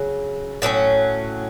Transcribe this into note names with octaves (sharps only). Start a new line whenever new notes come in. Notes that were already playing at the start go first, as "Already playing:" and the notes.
Already playing: C#3 F#3
A2 F#3 A3 C#4